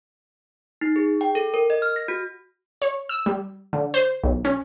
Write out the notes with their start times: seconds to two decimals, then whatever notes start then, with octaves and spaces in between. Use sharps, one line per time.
0.81 D#4
0.96 G#4
1.21 G5
1.35 A4
1.54 A#4
1.70 D#5
1.82 F6
1.96 A#6
2.08 F#4
2.82 C#5
3.09 E6
3.26 G3
3.73 D3
3.94 C5
4.24 B1
4.45 C#4